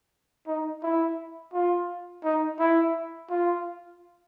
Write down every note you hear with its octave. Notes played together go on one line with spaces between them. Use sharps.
D#4
E4
F4
D#4
E4
F4